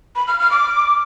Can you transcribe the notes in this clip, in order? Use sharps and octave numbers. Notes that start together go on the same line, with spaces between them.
B5
F6
F6
D6